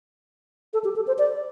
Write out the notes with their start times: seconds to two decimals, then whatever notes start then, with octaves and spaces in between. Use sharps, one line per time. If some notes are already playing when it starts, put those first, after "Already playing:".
0.73 A4
0.84 G4
0.96 A4
1.07 C5
1.18 D5